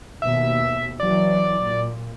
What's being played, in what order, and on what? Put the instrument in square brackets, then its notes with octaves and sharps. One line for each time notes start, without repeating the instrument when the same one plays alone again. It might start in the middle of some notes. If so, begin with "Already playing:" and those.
[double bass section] D#2 B2 [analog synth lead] E5
[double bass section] E3 F#3 [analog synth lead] D5
[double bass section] A#2